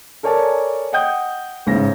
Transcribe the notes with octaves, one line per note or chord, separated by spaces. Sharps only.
A4 A#4 C#5 D5 G#5 A5
D#5 F#5 G5 D#6 G6
A1 G#2 C#3 A#6